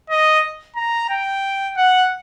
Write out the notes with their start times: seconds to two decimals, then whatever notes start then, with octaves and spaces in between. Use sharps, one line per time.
0.10 D#5
0.76 A#5
1.10 G5
1.77 F#5